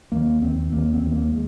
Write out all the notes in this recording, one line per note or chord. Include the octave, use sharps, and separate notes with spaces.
D#2 A#3
D#2 C4
D#2 A#3
C4
D#2
A#3
G#3